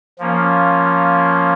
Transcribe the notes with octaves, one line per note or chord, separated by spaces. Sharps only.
F3 A#3 C#4